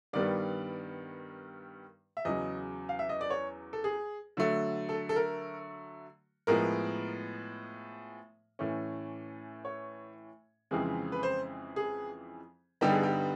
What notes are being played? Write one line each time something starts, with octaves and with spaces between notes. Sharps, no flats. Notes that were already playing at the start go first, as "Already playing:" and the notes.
G2 D#3 G3 B3 D5
E5
E2 C#3 F#3 D#5
F5
E5
D#5
D5
C#5
A4
G#4
D3 F#3 A3
A4
A4
A#4
A2 F3 G#3 B3 A#4
A2 E3 A3 C#4
C#5
F2 C#3 E3 G#3 C4
B4
C5
G#4
G2 D3 G3 B3 D#4 G4
G#4
G4